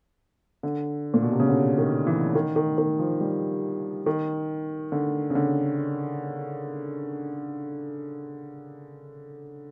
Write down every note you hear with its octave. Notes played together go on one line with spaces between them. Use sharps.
D3
A#2
B2
C3
C#3
D3
D#3
E3
D#3
D#3
D#3
F3
G3
D#3
D3
C#3
D3